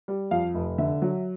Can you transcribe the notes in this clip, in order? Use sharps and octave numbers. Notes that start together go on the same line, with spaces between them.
G3
F2 F5
F1
D3 E5
F#3